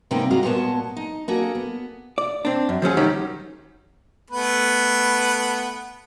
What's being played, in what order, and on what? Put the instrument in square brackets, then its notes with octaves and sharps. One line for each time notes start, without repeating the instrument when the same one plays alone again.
[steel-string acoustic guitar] C3 G#3 A#3 B3 D#4 G5
C3 G3 G#3 F4 F#4 A#5
A#2 G#3 B3 G#4 C#5 A5
D#4
A#3 D4 F#4 G#4 A4
B3
[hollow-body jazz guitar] D5
C4 D4
F#2
F3 F#3 C#4 G#4
D#3 F#3 G3 C#4 D#4
[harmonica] A3 B3 B4